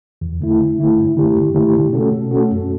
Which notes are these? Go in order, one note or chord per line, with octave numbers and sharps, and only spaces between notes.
E2
D3 A3 E4
E2
D3 A3 E4
G2
D3 A3 E4 G4
G2
D3 A3 E4 G4
B2
A3 C#4 F#4 A4
B2
A3 C#4 F#4 A4
F#2